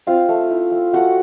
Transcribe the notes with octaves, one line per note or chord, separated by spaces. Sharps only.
C4 F4 F5
A3
E4
A3
A3 F#4 F#5